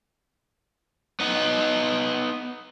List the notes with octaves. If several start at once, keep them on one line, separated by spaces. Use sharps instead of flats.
B3 D#4